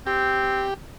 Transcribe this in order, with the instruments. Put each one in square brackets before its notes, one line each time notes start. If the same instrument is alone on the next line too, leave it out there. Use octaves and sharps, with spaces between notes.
[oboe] C4 [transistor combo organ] G4